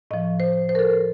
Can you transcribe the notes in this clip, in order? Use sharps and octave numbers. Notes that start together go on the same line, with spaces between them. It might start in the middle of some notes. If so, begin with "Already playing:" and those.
A2 F3 D#5
C5
C5
A#4
A4